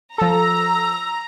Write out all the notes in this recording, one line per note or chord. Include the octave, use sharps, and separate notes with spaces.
F3 A4 A#5 E6